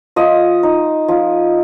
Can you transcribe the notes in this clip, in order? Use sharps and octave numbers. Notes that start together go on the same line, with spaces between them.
F3 D#5
D#4
F3